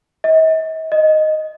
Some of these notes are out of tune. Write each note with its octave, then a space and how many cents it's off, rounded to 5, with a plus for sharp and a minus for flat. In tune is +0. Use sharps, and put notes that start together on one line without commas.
D#5 +45
D#5 -5